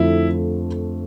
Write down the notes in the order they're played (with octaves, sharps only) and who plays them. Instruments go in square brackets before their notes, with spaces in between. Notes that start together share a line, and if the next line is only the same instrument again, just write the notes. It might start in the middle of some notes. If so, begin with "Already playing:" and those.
Already playing: [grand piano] F2 D3 F3 A3 [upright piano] E4